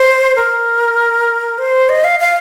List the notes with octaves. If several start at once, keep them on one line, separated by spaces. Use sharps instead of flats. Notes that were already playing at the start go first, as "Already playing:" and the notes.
Already playing: C5
A#4
C5
D#5
F5
F5